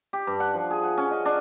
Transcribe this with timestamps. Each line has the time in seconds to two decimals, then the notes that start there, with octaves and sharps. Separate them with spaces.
0.13 G4
0.27 G2
0.40 F#5
0.54 F3
0.71 G#4
0.84 F#5
0.97 C#4
1.11 D#5
1.25 D4